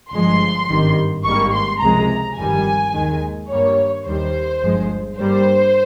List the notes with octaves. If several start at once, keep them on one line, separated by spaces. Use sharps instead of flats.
G1 G2 F3 G#3 C6
G#1 G2 D#3 G3
G#1 G#2 G3 A#3 C#6
C6
C#2 C3 F3 G#3 A#5
G1 F2 D#3 G3 G#5
D#2 D#3 G#3
G2 G3 A#3 C#5
D#2 D#3 G3 C5
G1 G2 F3 G#3
G2 G3 A#3 C5